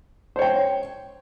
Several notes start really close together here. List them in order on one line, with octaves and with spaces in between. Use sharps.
C5 C#5 G5